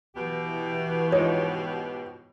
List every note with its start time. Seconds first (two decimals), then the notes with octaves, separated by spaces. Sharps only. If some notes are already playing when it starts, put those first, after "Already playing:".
0.16 B2 E3 G4
1.12 G#2 F3 D#4 C#5